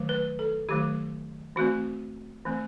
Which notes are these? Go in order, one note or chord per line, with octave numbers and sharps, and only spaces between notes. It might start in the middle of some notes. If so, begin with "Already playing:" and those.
Already playing: D#3 F#3 A3
B4
A4
D#3 F#3 A3 G4
E3 A3 C4 F#4
E3 A3 C4